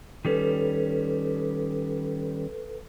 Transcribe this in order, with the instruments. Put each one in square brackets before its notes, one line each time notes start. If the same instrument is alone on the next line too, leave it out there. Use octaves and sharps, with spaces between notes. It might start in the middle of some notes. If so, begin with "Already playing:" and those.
[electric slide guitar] D#3 G3 C#4 [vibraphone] A4 B4